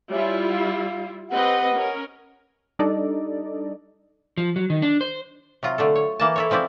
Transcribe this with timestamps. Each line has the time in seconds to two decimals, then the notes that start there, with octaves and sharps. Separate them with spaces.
0.10 G3 E4 F4 C#5 E5 G#5
0.48 F5
1.30 C4 G4 B4 D#5 F#5
1.75 C#4 A#4
2.79 G3 D4 D#4 A4 D5 D#5
4.37 F3
4.56 F#3
4.70 D#3
4.82 D4
5.01 C5
5.63 C3 F#3 F4 A#5
5.78 D3 A3 A4
5.95 C#5
6.19 E3 A#3 A5
6.36 E4 A4 C#5
6.50 C#3 F3 C4 E4 D5